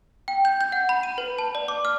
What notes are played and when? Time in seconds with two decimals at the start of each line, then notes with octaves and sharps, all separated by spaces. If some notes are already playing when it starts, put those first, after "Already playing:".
0.28 G5
0.45 G6
0.61 G6
0.72 F#5
0.89 B5
1.03 D#7
1.18 B4
1.38 A5
1.55 D5
1.68 D6
1.85 F6